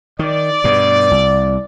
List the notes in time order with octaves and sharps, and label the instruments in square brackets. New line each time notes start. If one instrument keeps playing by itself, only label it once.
[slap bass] D#3 [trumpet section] D5
[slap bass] G2 B2
C2